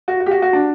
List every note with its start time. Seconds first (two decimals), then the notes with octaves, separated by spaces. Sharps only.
0.08 F#4
0.20 F#4
0.26 G4
0.31 F#4
0.42 F#4
0.53 D4